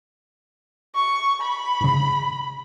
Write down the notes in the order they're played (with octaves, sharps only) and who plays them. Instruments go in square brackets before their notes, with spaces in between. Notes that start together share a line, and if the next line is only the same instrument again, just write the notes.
[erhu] C#6
B5
[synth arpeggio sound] G#2 C#3